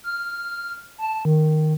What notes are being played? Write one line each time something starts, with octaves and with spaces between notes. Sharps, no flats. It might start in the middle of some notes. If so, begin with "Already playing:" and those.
F6
A5
D#3